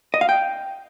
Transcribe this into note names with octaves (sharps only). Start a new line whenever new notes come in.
D#5
F5
G5